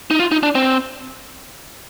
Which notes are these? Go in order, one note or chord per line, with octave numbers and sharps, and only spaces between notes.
D#4
F4
D#4
D4
C4